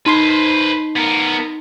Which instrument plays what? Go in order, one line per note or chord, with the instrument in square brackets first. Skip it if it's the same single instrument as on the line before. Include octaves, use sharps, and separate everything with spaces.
[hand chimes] D#4 C6 C7 [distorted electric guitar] B4 C5
[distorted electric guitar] B3 A#4